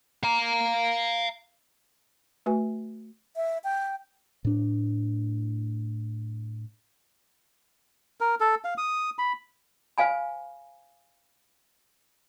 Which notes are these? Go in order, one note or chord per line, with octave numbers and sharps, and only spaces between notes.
F5 A#5
A3 F#4 B4 G#5
E5
G5
A2 D4
A#4
A4
F5
D#6
B5
C5 F5 G#5 B5